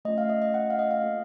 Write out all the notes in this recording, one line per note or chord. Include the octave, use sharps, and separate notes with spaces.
A3 C#4 F4 D#5
F5
D#5
D#5
F#5
F5
D#5
F5
A#3 F4 A4